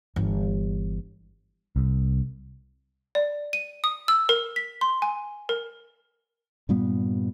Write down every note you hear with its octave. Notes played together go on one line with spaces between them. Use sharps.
G1 E3
C2
D5
D#7
D#6
E6
A#4
B6
C6
G#5
A#4
G2 A#2 G3 B3